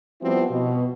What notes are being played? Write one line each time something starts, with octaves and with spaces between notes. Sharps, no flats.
F3 G3 B3 C4 E4 F#4
B2